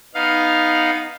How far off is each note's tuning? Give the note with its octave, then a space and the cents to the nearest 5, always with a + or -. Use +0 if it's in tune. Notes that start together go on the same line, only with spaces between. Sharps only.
B3 +0 D#4 +0 F5 +5